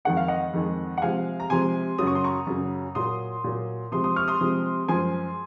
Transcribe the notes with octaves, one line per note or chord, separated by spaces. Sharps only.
F2 D#3 G#3 F#5
F5
D#5 F#5
F2 D#3 G#3
F#5
C3 F3 G#3 F5 G#5
A#5
C3 F3 G#3 G#5 C6
F#2 C#3 F#3 D#6
C#6
C6
A#5 C#6
F#2 C#3 F#3
A#2 F#3 C6 D#6
A#2 F#3
C3 F3 G#3 C6 D#6
C6 D#6
C#6 F6
C6 D#6
C3 F3 G#3
F#2 F3 G#3 G#5 C6